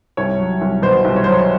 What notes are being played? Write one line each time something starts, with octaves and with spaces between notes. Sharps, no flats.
C2 C#5
F#3
C2
B2 C5
C2
C#5
C5
F#3 C#5